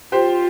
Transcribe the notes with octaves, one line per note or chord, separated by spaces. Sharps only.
F4 G4 C5